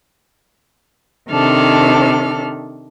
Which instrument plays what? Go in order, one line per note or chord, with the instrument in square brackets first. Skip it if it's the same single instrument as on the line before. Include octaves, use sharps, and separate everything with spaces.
[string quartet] C3 D#3 D4 A4 F6